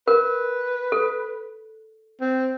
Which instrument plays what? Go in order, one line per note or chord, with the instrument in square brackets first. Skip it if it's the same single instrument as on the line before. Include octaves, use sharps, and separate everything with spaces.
[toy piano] A#4 [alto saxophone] B4
[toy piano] A4
[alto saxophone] C4